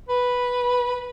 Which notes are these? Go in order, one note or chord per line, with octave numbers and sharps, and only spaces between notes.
B4